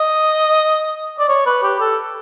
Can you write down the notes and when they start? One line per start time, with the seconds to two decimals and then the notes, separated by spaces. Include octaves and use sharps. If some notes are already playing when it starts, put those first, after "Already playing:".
Already playing: D#5
1.19 D5
1.29 C#5
1.46 B4
1.63 G4
1.80 A4